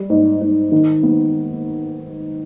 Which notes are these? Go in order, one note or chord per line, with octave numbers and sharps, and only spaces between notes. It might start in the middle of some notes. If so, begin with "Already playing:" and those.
Already playing: G3
G#2
G#2
D#3
B3